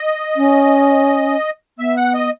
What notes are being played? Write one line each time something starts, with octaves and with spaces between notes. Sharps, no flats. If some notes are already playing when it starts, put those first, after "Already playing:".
Already playing: D#5
C#4
B3 E5
F#5
D#5